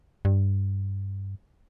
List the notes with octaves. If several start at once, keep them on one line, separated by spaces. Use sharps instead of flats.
G2